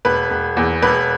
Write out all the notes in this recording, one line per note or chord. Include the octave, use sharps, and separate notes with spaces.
E1 B4
E1
E2
E1 B4